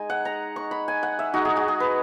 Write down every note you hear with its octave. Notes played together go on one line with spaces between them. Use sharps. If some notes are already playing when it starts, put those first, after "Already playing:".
Already playing: G#3 D#4 G#5
F#5
A#5
C#6
B5
G#5
F#5
E5
G#3 D#4 F#4
G#4
F#4
G#4
B4